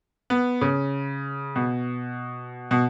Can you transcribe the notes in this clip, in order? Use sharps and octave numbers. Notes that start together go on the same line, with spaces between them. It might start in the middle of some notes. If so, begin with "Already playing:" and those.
B3
C#3
B2
B2